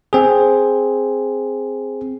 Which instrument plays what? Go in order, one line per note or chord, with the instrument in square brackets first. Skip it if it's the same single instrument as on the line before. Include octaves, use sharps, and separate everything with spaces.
[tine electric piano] C4 G#4